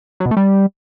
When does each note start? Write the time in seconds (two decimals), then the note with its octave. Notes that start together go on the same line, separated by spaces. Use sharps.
0.20 F#3
0.26 B2
0.31 A3
0.37 G3